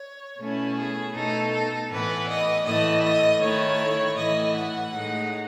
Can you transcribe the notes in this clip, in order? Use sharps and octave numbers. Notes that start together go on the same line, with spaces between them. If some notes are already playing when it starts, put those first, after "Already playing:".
Already playing: C#5
B2 A3 C#4 E4
G#4
B2 A3 D#4 A4
A4
A2 E3 B3 B4
D#5
A2 E3 A3 E4 D#5
D#5
D#3 A3 E4 C#5
A2 E3 A3 E4 D#5
F#5
A2 G#3 D#4